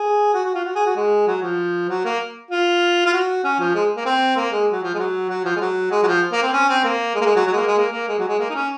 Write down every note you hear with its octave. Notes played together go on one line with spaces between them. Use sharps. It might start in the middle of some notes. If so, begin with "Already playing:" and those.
Already playing: G#4
F#4
F#4
F4
F#4
G#4
F#4
G#3
F#3
F3
F#3
A#3
F4
F4
F#4
C#4
F3
G#3
A#3
C4
A#3
G#3
F#3
F3
G#3
F#3
F#3
F3
G#3
F#3
G#3
F#3
F3
A#3
C4
C#4
C4
A#3
G#3
A#3
G#3
F#3
F#3
G#3
A#3
G#3
A#3
A#3
G#3
F#3
G#3
A#3
D#4
C#4